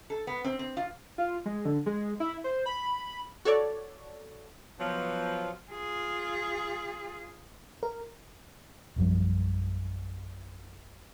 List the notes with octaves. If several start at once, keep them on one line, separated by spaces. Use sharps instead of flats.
A4
B3
C4
C4
F4
F4
G#3
D3
G#3
E4
C5
B5
F#4 A4 C#5 D5
B2 F3 F#3 B3
F4 G#4
A#4
A#1 F#2 F3 G3